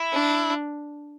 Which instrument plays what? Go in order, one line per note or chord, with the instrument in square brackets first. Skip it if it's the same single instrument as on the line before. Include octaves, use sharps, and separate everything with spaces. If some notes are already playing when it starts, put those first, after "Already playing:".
Already playing: [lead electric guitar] E4
[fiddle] D4